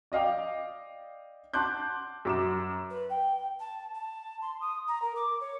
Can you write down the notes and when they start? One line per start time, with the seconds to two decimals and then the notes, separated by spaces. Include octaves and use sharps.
0.12 D5 D#5 F5 G5 D6
1.54 F#5 A5 C6 D6 F#6 G6
2.25 F#2 D6 E7
2.90 B4
3.09 G5
3.59 A5
3.94 A5
4.41 C6
4.61 D#6
4.87 A#5
5.02 A#4
5.15 D6
5.40 C#5